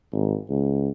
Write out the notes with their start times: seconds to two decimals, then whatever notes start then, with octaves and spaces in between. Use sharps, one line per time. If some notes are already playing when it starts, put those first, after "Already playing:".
0.13 G#1
0.50 C#2